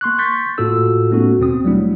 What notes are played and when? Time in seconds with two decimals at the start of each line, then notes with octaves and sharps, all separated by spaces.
0.01 A#3 C6 C#6 F#6
0.18 C6 C#6 G6 A6 B6
0.58 A2 A#3 F4 F#4 A4 E6
1.11 A3 B3 C#4 D#4 F#4 A4
1.39 D#2 B2 C4 D#6
1.64 F#3 G3 A3 D4 E4